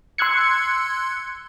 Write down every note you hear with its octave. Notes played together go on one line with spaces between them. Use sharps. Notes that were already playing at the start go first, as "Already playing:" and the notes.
C6 E6 F#6 G#6 C#7